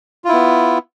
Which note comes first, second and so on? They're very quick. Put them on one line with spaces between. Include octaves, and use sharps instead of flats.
F4 E4 B3